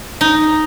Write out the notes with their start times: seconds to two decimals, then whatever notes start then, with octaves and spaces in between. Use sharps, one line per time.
0.21 D#4